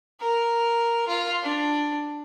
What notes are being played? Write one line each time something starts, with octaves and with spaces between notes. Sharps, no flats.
A#4
F4
D4